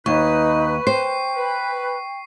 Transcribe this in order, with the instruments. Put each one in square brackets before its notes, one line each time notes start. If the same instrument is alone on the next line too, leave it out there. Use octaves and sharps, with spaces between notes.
[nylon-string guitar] D#2 [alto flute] D#4 [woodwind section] B4 [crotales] C#6
[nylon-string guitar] C5 [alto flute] G5 [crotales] C7
[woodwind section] B4